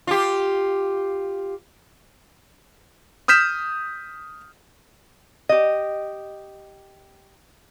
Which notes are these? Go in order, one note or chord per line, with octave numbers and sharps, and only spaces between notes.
F4 G4
D#6 F6 G6 B6 E7
G4 D#5